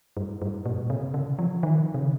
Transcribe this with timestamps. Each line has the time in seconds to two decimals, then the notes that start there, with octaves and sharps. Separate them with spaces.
0.17 G2
0.42 G2
0.66 A#2
0.90 C3
1.14 C#3
1.39 F3
1.63 D#3
1.94 C3
1.99 C#3